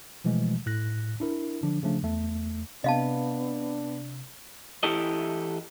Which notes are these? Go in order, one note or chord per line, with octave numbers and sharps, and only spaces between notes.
B2 E3 F3 G#3 A3
A2 F#6 A#6
D4 E4 A#4
D3 F3 D4
C#3 F3 A3 D4
E2 A3
C3 B3 D4 D#5 F5 A5
E3 E4 G4 A4 D#5